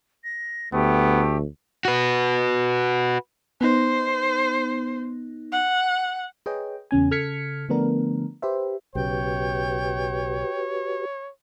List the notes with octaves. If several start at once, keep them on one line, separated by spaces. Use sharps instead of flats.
A#6
D2 A3 B3 G4
F#4 B4
B3 D#4 C5
F#5
G#4 B4 C#5 D#5 G5
E2 C#3 C#4 G#5
C#3 A4 F6 G#6 B6 C#7
D3 F3 A3 B3 D4 A#4
G4 B4 C5 E5
B1 C#3 F#4 G4 B4 C#5 G5